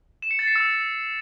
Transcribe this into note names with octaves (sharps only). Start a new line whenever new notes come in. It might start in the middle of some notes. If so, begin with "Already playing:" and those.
E7
C#7
A6
C7
E6